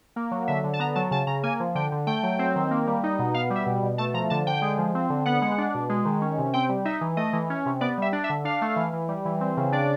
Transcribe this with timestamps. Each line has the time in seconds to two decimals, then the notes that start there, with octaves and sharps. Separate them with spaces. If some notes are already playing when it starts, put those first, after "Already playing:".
0.16 A#3
0.31 F#3
0.48 D3 E5
0.64 D3
0.73 A5
0.79 B3 A#5
0.95 F#3 A5
1.11 C#3 A5
1.27 C#3 A#5
1.43 A#3 G#5
1.60 F3
1.75 D3 G5
1.92 D3
2.07 A3 G5
2.23 F#3
2.39 C4
2.56 D#3
2.71 A#3
2.87 G3
3.03 D#4
3.19 B2
3.34 B3 F5
3.50 G3
3.55 E5
3.66 B2
3.83 B2
3.98 A3 A5
4.14 F3 A#5
4.30 D3 A5
4.47 D3 G5
4.62 G#3
4.78 F3
4.95 C4
5.10 D3
5.25 B3 F#5
5.42 G#3
5.58 D4
5.75 B2
5.89 G#3
6.05 D#3
6.22 C#4
6.38 C3
6.53 C4 G5
6.69 G3
6.85 D#4 E5
7.01 E3
7.17 A3 D#5
7.33 E3
7.50 C#4
7.66 C3
7.81 B3 D5
7.98 G3 E5
8.13 D4
8.24 E5
8.30 D3
8.45 D4 F5
8.62 A3
8.76 E3
8.93 E3
9.09 G3
9.25 E3
9.41 C4
9.57 C#3
9.72 D4 D5